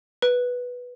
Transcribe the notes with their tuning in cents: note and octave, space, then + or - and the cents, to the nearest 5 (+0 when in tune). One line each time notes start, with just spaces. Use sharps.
B4 -5